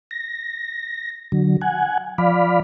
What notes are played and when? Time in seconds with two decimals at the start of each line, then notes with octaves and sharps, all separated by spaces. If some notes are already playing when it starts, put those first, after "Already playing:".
0.11 A#6
1.32 D3 F#3
1.61 F#5 G#5
2.18 F3 D5 F5 B5